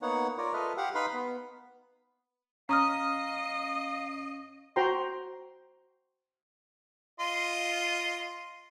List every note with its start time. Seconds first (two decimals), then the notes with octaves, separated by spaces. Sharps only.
0.02 A#3 B3 D#4 C#5 F#5
0.38 F4 A#4 C#5 D5
0.53 F4 A4 B4 D#5 E5 F6
0.77 G4 F5 F#5
0.95 D#4 B4 F5 B5 C6
1.13 B3
2.69 C#4 D#5 F5 A#5 D#6 F6
4.76 F#4 C5 G5 A#5 C6
7.20 F4 D#5 C6